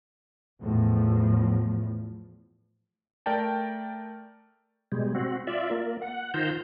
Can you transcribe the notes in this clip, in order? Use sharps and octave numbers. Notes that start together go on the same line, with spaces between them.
E2 A2 F3
A3 A#4 D5 G5 A5
B2 G3 G#3
C4 F#4
F4 D5 E5
A#3
F#5
D#3 F4 C5 A#5 G6